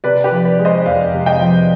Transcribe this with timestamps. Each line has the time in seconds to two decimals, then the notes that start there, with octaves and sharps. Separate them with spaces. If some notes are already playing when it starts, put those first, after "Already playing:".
0.04 C3 B4 D5
0.24 G4 B4
0.31 F3
0.45 B4 D5
0.59 G#3
0.65 C5 D#5
0.86 F2 D5 F5
1.13 C3
1.26 D#5 G5
1.41 F3